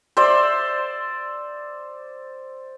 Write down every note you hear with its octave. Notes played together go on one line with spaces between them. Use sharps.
C5 D5 E5 C6